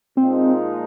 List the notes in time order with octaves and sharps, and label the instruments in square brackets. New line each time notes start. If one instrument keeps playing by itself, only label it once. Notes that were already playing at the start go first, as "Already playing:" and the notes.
[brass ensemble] A#2 F3 G#3 D#4 [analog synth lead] C4